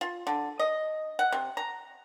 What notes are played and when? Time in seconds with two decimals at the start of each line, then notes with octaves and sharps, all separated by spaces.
0.01 F4
0.27 D3
0.60 D#5
1.19 F#5
1.32 C3
1.57 A#5